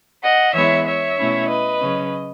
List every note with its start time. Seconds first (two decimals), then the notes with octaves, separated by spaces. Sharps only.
0.22 D#5 F#5
0.54 E3 G#3 B3 E4 C#5 E5
0.86 C#5 E5
1.18 B2 A3 C#4 E4
1.48 B4 D#5
1.80 C#3 F#3 C#4